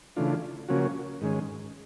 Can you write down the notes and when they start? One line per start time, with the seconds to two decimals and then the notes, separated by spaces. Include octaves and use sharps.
0.16 C#3 E3 A3 D4 F4
0.68 C#3 F3 A#3 C#4 F#4
1.21 G#2 D#3 G#3 C#4